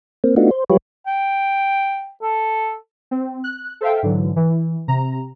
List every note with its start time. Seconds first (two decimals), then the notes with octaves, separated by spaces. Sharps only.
0.24 A#3 C4
0.36 A3 B3 D4 D#4 F4 F#4
0.51 C5
0.70 F#3 G3 F4 G4 B4 C#5
1.07 G5
2.22 A4
3.11 C4
3.44 F#6
3.81 A4 C5 E5 F5 G5
4.03 G#2 D3 E3 F#3
4.36 E3
4.88 C3 A#5